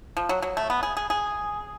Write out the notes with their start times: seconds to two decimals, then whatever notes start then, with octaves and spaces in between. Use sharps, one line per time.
0.17 F3
0.29 F#3
0.42 F#3
0.57 A3
0.70 B3
0.83 G#4
0.97 G#4
1.10 G#4